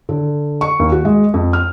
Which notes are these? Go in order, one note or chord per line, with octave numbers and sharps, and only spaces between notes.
D3
C#6
D#2
F#4
G#3
F2
F6